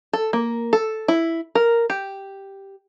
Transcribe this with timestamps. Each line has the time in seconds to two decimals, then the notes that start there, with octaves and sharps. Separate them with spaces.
0.13 A4
0.33 A#3
0.73 A4
1.08 E4
1.55 A#4
1.90 G4